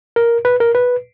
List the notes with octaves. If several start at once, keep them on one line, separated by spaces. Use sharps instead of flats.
A#4
B4
A#4
B4